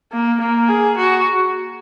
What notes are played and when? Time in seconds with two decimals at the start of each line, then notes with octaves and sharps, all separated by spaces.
0.12 A#3
0.40 A#3
0.69 G#4
0.98 F#4